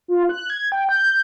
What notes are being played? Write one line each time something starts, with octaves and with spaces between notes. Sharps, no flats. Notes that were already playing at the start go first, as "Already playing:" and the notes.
F4
F#6
G#6
G5
G6